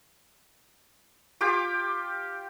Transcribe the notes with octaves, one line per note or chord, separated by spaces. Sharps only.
F4 G4 G5 D6